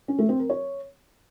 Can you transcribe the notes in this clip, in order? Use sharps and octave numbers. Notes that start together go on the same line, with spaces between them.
C#4
A3
C4
A#4
C#5